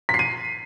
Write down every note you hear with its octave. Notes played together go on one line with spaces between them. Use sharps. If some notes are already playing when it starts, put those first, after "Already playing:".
B6
C7
D#7